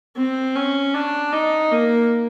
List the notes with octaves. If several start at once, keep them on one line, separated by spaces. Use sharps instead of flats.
C4
C#4
D4
D#4
A#3